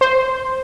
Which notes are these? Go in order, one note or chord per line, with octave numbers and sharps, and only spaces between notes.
C5